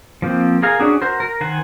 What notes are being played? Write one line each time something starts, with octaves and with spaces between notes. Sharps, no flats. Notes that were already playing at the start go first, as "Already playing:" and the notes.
F3 A#3 C4
G#4 A#4 F5 G#5 A#5
C#4 D4 F#4 G#4
F#4 A#4 C5
A#4
D#3 C5 F#5 G#5